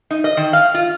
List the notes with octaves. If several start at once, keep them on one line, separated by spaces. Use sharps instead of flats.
D#4
D#5
D#3
F5
F4